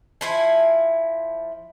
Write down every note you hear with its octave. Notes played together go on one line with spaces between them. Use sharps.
F3 E4 G#5